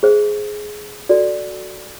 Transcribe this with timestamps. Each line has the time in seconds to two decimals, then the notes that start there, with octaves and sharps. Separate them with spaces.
0.03 G#4 C5 E5
1.09 F#4 A4 D5